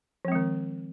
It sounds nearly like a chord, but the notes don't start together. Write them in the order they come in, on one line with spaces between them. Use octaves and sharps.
F3 C4 G#3 D#3